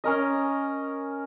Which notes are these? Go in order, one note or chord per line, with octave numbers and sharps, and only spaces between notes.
C#4 A#4 D#5